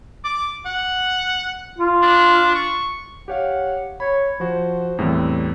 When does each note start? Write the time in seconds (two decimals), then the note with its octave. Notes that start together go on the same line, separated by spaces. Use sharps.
0.24 D6
0.65 F#5
1.79 F4
2.02 D4
2.55 C#6
3.28 G4 C#5 F5 F#5
4.00 C#5 B5
4.40 F3 F#4 C5
4.98 E2 A2 G3 C4